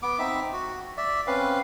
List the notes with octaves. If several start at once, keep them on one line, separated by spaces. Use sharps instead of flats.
B3 D6
C4 D#4 E5
F#4
D5 E5
C4 C#4 B4 F5